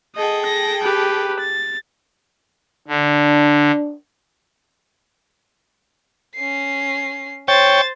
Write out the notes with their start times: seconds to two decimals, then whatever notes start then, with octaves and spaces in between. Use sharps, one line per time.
0.16 G#4 A4 D#5 G5
0.45 A#6
0.82 G4 B4
1.40 A6
2.88 D3 D4
6.35 C#4 C7
7.48 C5 C#5 G5 A6